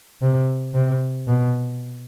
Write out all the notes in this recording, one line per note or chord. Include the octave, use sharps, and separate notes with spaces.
C3
C3
B2